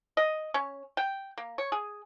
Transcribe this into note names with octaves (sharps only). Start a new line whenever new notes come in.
D#5
C#4
G5
A#3
C#5
G#4